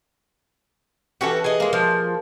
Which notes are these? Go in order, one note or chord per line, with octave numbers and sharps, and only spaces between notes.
E3 C#4 F#4 G4 A4
G#4 D#5
G#3 A#3
F3